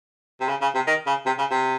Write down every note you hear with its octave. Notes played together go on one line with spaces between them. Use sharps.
C3
C#3
C#3
C3
D#3
C#3
C3
C#3
C3